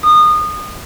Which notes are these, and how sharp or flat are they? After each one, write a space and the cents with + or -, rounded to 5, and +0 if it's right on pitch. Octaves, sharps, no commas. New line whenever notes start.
D#6 -25